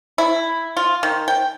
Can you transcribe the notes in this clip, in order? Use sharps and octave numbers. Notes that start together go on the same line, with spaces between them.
E4
F4
D#3
G5